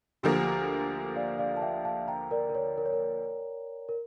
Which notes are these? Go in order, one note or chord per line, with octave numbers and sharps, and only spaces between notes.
D2 D3 F3 A#3 G4
D5 F5
D5 F5
A5
E5 G5
F5 A5
G5 A#5
A#4 D5
A#4
C#5
A#4
C#5
A#4
A#4